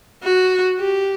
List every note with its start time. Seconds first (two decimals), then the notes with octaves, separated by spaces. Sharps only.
0.23 F#4
0.79 G4